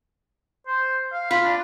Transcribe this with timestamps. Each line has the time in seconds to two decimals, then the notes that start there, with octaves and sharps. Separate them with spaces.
0.67 C5
1.13 F5
1.31 F4 B5
1.44 D4